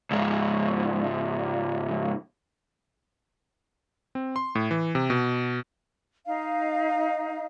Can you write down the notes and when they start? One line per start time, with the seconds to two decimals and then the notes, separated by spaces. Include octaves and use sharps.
0.11 C#2 G#2
4.15 C4
4.36 C6
4.55 A2
4.71 E3
4.95 C3
5.10 B2
6.26 D#4 F5